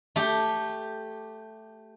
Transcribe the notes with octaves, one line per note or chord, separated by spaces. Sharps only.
A3 G4